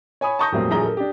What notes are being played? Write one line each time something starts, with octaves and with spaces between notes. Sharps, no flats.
C#5 G#5 B5 D#6
A5 A#5 C#6 D#6 G6 A#6
F2 A#2 F#3 G3 A3 C4
D#1 A#1 F#3 G#4 A#5 G7
A4 A#4
D4 G4